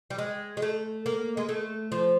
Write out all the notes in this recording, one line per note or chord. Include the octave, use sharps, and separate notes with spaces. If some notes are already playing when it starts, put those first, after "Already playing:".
G3
G#3
G#3
A3
A#3
G#3
A3
F3